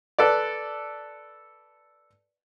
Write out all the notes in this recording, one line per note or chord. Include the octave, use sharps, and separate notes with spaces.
A4 B4 D5